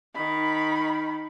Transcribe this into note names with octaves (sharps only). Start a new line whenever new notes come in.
D#3 B5